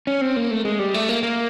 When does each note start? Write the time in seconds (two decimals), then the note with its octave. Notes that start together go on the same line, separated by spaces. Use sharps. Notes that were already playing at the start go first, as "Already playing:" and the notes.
0.07 C#4
0.21 C4
0.36 A#3
0.51 A3
0.65 G#3
0.79 G3
0.94 A3
1.09 A#3
1.23 A#3